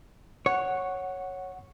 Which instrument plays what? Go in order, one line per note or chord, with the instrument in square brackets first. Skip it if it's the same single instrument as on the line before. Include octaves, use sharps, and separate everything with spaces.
[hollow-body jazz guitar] C#5 [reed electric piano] F#5